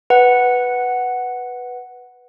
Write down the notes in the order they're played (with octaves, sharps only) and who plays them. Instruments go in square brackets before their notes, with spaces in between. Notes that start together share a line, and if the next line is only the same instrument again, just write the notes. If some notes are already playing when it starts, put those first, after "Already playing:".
[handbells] B4 F#5